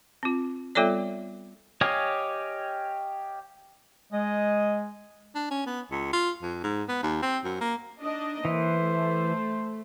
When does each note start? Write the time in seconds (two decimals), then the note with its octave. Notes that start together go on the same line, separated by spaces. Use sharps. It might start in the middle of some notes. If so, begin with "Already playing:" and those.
0.23 C4 F4
0.75 G3 B3 F4 A4 C#5 D5
1.81 G4 C#5 D#5 F5 G#5
4.13 G#3 D#5
5.35 D4
5.51 C#4
5.66 B3
5.91 C#2
6.13 F4
6.42 F2
6.64 G#2
6.89 B3
7.03 D#2
7.22 C4
7.44 F#2
7.61 A#3
8.01 D4 D#4 D#5
8.45 E3 A#3 C5
8.84 A3